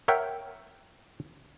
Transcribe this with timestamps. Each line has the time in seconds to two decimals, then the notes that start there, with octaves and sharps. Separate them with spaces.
0.08 A#4 C#5 E5 F#5 G5